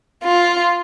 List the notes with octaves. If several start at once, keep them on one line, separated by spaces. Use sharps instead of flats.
F4